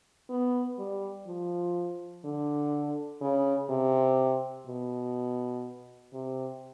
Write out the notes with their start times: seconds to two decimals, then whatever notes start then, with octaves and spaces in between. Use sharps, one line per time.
0.30 B3
0.79 G3
1.27 F3
2.24 D3
3.21 C#3
3.70 C3
4.67 B2
6.13 C3